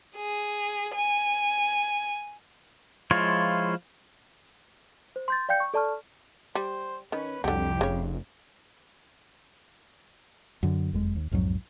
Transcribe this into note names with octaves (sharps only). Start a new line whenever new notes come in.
G#4
G#5
F3 G#3 E4 F4 C#5
C5
C6 G6 A6
D5 F5 G5 G6 C#7
C#6
A4 D5 A5 C#6 F6
G3 C5
D#3 C#4 B4
C2 F2 D3 F#3 G4
F1 C#3 C#5
F#2 D3
F#1 F2 G#3
D#2
B1 F2 G#2 F#3